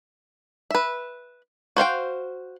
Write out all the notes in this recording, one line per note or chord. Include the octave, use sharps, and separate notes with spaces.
B4 E5
F#4 C5 F5 G5